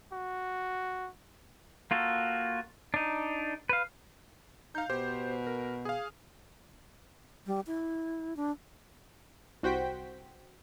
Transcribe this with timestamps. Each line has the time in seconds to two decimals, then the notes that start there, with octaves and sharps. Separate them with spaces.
0.12 F#4
1.91 A#3 F4 F#4 A4
2.94 D4 D#4
3.69 B4 F5
4.75 D#4 F5 G6
4.90 B2 G4 C5
5.47 A#4
5.85 G#4 F5
7.46 G3
7.67 E4
8.37 D4
9.63 C2 F#4 C5 G5 B6